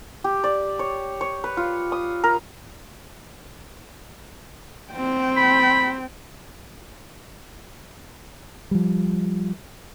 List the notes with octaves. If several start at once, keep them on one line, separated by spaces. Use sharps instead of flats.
G4
D5
C#5
C#5
B4
F4
D#6
A#4
C4 G5
B5
F3 G3